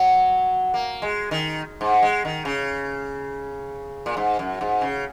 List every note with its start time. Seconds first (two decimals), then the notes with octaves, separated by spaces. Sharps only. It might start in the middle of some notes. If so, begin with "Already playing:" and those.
Already playing: F#3
0.74 A#3
1.02 G#3
1.31 D#3
1.81 G#2
2.02 G#3
2.25 D#3
2.45 C#3
4.06 A#2
4.17 G#2
4.39 F#2
4.61 G#2
4.81 C#3